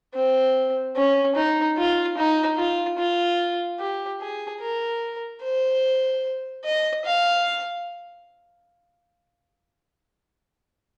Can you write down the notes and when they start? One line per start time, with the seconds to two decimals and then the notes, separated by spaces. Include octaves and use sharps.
0.15 C4
0.96 C#4
1.36 D#4
1.77 F4
2.18 D#4
2.58 F4
2.98 F4
3.80 G4
4.21 G#4
4.61 A#4
5.43 C5
6.65 D#5
7.05 F5